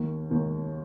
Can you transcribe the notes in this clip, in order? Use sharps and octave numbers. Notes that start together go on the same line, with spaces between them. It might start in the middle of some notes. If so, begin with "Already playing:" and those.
Already playing: D#2 D#3 A#3
D#2 D#3 A#3